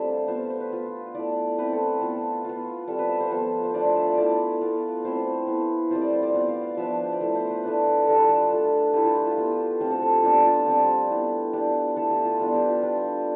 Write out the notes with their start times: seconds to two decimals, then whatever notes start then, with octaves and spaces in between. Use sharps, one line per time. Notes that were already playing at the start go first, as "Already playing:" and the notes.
Already playing: G3 A3 C4 D4 F4 D5 E5
0.28 B3 F4 C5
0.50 C5
0.61 B4
0.71 B3 F4
1.15 A3 E4 D5
1.58 A3 C4 E4 B4
1.73 A4
2.01 B3 F4
2.44 B3 F4
2.88 G3 C4 F4 A4
2.99 B4
3.09 E5
3.20 C5
3.31 F3 B3 F4 A4
3.64 C5
3.74 A3 D4 F4 D5
3.85 D5
3.96 E5
4.07 D5
4.17 A3 E4 D5
4.61 B3 F4
5.05 A3 C4 E4 C5
5.47 B3 E4
5.91 G3 C4 F4 C5
6.01 D5
6.13 C5
6.23 D5
6.34 B3 F4
6.48 F5
6.63 F5
6.77 F3 B3 D4 E5
7.04 C5
7.12 D5
7.21 A3 E4 E5
7.35 C5
7.50 B4
7.63 A3 D4 F4 B4
8.07 G3 D4 F4 A4
8.18 B4
8.29 A4
8.50 A3 D4 F4
8.93 A3 E4 G4
9.04 F4
9.16 G4
9.26 F4
9.37 B3 F4
9.80 A3 C4 F4 G4
9.91 A4
10.02 A4
10.13 G4
10.23 G3 B3 D4 F4 G4
10.45 F4
10.67 G3 C4 F4
11.10 B3 E4
11.53 B3 D4 F4 G4
11.97 A3 E4 A4
12.11 G4
12.25 F4
12.39 G3 B3 D4 F4
12.54 G4
12.69 F4
12.83 G3 D4 F4